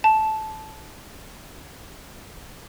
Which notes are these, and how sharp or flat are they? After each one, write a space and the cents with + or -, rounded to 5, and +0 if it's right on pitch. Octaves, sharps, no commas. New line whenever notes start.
A5 -15